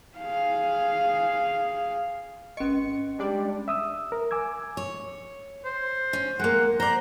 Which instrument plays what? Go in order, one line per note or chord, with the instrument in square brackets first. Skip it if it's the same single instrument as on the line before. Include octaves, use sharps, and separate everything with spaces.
[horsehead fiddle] G#4 F5
[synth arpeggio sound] G#1 C#7 [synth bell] C#4 D#5
[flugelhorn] G3 [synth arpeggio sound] G#3 D4 D5
[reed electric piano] E5 D#6 E6
A#4
G#5 D6 E6 G#6
[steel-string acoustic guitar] C#5
[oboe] C5
[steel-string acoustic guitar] C#4
[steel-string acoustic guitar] G#3 A#3 [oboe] F#5
[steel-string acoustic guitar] C5 D5 [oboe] A#5